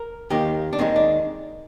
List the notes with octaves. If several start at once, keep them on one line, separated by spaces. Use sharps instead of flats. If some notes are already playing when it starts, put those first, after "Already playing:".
Already playing: A#4
D#2 D#3 A#3 G4
D4
D#2 D#3 G#3 C4
D4